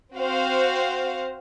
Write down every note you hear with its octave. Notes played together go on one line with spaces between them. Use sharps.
C4 F#4 C5 F5